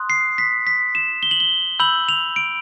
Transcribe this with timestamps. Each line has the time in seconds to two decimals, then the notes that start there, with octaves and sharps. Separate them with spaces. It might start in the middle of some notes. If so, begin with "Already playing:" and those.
Already playing: C6 D#6 F#6
0.10 C7
0.38 B6
0.67 B6
0.95 E7
1.23 G7
1.31 F#7
1.40 G7
1.79 B5 E6 G6 F#7
2.09 F7
2.36 D7